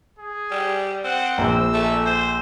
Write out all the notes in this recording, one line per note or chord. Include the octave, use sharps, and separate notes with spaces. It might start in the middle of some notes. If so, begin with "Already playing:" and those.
G#4
G3
C4 F#5
A#1 E6
A3
C5